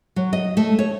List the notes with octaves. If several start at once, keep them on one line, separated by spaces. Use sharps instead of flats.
F#3
D#5
A3
C#5